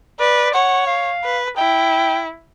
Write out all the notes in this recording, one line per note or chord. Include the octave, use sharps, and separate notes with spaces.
B4 D5
C#5 F#5
F5
B4
E4 G5